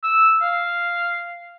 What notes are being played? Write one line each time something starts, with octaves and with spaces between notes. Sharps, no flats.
E6
F5